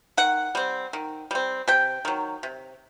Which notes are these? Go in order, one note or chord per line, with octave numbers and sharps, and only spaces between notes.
D#3 F#5
G3 C4
D#3
G3 C4
C3 G5
D#3 F#3
C3